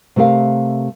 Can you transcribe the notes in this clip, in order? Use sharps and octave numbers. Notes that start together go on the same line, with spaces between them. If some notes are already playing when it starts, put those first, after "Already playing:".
C3 A3 G4 A#4 F5